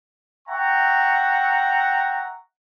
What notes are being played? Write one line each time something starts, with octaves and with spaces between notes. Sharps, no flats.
E5 F#5 G5 A#5 C#6